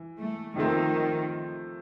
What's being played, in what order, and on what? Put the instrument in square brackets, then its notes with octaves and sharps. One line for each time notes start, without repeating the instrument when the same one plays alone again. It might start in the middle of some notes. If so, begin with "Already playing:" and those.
Already playing: [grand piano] E3
[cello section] A3
[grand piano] C3 F3 A3 C4 [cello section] D#3